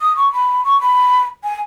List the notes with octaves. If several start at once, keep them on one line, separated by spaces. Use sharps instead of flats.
D#6
C#6
B5
C#6
B5
G#5